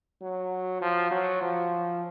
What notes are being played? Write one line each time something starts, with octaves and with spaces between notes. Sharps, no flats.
F#3
F3
F#3
F3